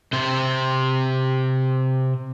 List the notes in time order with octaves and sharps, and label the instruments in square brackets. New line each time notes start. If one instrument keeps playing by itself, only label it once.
[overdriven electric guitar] C3 C5